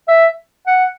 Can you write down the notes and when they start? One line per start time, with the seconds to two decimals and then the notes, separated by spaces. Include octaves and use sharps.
0.08 E5
0.67 F#5